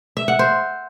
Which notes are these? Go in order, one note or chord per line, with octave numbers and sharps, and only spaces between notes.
E5
F#5
C5